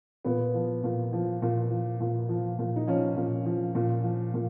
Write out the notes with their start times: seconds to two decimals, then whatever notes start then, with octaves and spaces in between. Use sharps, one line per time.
0.24 A#2 B3
0.54 F3
0.84 A#2
1.13 F3
1.42 A#2
1.70 F3
2.01 A#2
2.29 F3
2.59 A#2
2.76 D#4
2.87 F3 C#4
3.17 A#2
3.46 F3
3.75 A#2
4.04 F3
4.34 A#2